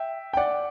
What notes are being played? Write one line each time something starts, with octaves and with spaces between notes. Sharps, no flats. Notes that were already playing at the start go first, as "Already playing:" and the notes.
Already playing: E5 G5
G5
D5 F#5